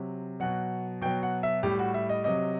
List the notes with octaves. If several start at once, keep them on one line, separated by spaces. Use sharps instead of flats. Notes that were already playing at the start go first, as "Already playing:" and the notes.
Already playing: C3 F#3
B2 F#3 F#5
B2 F#3 G5
F#5
E5
A2 G3 G4
F#4
E5
D#5
C3 F#3 D#5